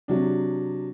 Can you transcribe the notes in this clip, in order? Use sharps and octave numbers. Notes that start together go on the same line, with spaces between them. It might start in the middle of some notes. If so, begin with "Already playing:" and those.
C3 F#3 D4